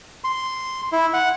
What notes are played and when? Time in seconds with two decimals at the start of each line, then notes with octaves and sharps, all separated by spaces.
0.24 C6
0.92 E4
1.14 F#5